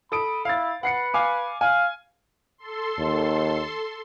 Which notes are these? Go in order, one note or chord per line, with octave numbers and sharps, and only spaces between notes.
A4 B5 D#6 D7
E4 F5 A6
B4 F#5 C7 C#7
F5 G#5 D6
F5 G#5
A4 C6
D#2